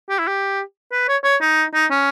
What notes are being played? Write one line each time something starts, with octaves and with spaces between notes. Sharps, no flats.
G4
E4
G4
B4
C#5
C#5
D#4
D#4
C#4